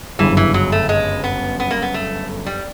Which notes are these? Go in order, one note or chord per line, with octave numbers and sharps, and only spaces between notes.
G1 F#2 C#3 E3
E3
F#3
A3
G#3
B3
B3
A#3
B3
A3
G3